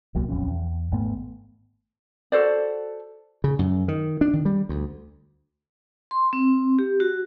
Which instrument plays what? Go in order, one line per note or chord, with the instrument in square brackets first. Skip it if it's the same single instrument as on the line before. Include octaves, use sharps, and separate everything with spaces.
[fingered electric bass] D#1 C2 F#3 A#3
D#1 B1 F2 C#4
E2
G#1 G#2 A3 B3
[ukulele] F#4 A4 C5 D5
[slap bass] C#3
F#2
D#3
D4
D#3
G3
D2
[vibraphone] C6
C4
G4
F#4